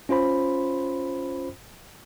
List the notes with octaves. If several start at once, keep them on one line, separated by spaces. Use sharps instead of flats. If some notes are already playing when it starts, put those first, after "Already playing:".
C#4 F4 C5 B5